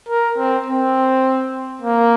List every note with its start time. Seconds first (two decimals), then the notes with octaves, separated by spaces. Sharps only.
0.09 A#4
0.37 C4
0.67 C4
1.82 A#3